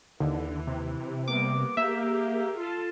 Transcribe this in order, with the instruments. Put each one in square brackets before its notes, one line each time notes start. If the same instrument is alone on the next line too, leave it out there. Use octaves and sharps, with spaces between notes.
[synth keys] D#2 [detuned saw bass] D3 [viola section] E3
[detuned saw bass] C3
[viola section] G3 A#3 B3 [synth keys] D6
[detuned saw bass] A#3 [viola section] G4 G#4 A#4 [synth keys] E5
[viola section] F4 A4 A5